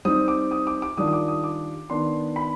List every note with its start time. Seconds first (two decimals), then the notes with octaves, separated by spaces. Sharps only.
0.05 G3 C4 D#4 D#6
0.28 D6
0.51 D#6
0.67 D6
0.82 D6
0.97 D#3 G3 D4 F4 D#6
1.07 D#6
1.13 D6
1.28 D#6
1.44 D6
1.90 D#3 B3 D4 C6
2.36 B5